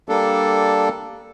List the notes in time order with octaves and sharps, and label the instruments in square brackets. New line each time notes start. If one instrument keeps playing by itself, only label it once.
[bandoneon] G3 A#3 D4 A4